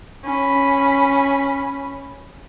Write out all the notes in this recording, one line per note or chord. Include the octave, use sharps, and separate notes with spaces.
C#4 B5